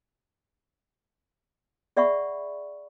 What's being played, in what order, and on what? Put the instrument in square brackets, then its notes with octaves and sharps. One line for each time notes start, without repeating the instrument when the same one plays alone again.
[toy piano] G#4 D5 E5 F#5 B5 C#6